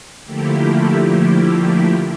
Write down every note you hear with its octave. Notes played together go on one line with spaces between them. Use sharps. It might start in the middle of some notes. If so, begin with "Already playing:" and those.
D3 F3 A3 A#3 E4 G4